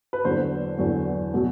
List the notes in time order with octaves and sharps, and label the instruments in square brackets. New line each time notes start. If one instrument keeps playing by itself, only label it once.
[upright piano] B4
E2 D3 F#3 C5
E2 D3 F#3
B2 F#3